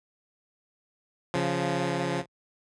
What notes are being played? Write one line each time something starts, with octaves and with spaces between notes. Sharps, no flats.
C#3 F3